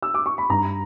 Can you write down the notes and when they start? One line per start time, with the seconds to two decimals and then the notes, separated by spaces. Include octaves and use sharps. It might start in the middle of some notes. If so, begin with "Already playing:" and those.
0.02 E6
0.14 D6
0.26 C#6
0.38 B5
0.50 G2 A#5